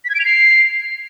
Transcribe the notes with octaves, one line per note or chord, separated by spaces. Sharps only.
B6
G#6
D7
F7
C7